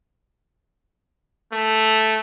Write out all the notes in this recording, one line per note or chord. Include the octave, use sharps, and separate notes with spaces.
A3